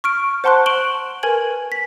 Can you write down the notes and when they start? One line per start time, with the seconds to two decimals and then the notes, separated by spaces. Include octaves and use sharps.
0.04 C#6 F6 D7
0.44 C5 F#5 A5 C6 C#6 F#6
0.66 C#6 D7 E7 F#7 G7
1.23 A#4 B4 G#5 G#6 F#7
1.72 B6